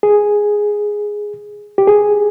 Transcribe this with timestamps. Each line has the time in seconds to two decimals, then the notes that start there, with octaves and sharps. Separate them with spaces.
0.03 G#4
1.78 G4
1.87 G#4